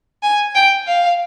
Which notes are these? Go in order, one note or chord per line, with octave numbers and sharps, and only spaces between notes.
G#5
G5
F5